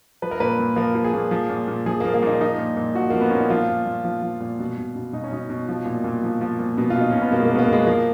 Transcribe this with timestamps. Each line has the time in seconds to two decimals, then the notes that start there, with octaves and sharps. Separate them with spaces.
0.22 F3 B4
0.31 A#4
0.40 A#2 B4
0.59 A#2
0.76 F3 A#4
0.95 F3
1.04 G#4
1.14 A#2
1.31 F3
1.50 A#2
1.68 A#2
1.86 F3 G#4
2.00 F3 A#3
2.14 A#3
2.23 A#2 D#4
2.40 F3 D#4
2.58 A#2
2.77 A#2
2.95 F3 F#4
3.10 F3 A#3
3.21 B3
3.30 A#2 C#4
3.40 D#4
3.50 F3 F4
3.68 A#2
3.86 A#2
4.05 F3
4.22 F3
4.41 A#2
4.59 B2
4.78 B2
4.96 B2
5.13 B2 D#4
5.24 C#4
5.32 B2 D#4
5.50 B2
5.69 F3
5.86 A#2
6.04 A#2
6.23 F3
6.41 F3
6.59 A#2
6.77 B2 B3
6.90 F4
6.96 B2
7.01 D#4
7.11 B2 C#4
7.21 B3
7.32 B2 A#3
7.40 G#3
7.45 A#3
7.50 B2
7.55 B3
7.59 A#3
7.68 B2 G#3
7.86 F3 A#3